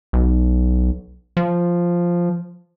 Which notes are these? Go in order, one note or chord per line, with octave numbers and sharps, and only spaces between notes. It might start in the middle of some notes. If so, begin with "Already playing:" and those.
B1
F3